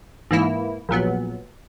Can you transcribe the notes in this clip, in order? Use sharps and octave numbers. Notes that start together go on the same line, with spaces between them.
G#2 E3 A#3 E4
A#1 A#2 F#3 B3